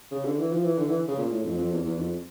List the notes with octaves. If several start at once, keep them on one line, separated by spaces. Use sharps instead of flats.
C#3
D3
E3
F3
E3
D3
E3
C#3
A#2
A2
F2
F2
E2
E2
F2